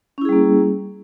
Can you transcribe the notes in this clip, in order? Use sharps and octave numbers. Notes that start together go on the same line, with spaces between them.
G3 A#3 C#4 E4 G#4